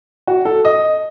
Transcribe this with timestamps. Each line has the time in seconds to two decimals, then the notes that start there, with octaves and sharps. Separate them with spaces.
0.27 F#4
0.45 A4
0.65 D#5